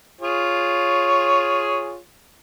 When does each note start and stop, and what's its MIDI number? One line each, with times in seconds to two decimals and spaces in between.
0.21 1.97 65
0.21 1.97 68
0.21 1.97 73